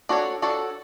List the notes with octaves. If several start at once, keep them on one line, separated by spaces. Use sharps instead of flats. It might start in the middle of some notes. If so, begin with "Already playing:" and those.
D4 F#4 A4 C#5
D4 F#4 A4 C#5